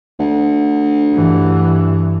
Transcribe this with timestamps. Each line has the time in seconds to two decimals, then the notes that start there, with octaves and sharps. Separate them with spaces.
0.19 D2
1.12 G2 E3